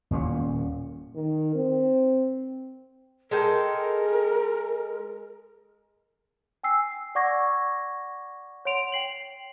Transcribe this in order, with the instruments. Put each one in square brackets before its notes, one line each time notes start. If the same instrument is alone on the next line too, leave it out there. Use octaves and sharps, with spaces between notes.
[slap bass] D#1 A#2 C4 C#4
[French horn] D#3
C4
[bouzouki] G#3 A4 G5 [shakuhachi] A#4
[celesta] G5 G#5 E6 C7
D5 F#5 C#6 D6 G#6 A#6
C#5 F#5 C6 D7 F7
G5 C7 F#7